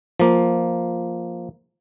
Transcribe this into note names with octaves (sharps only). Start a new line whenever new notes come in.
F3 A#3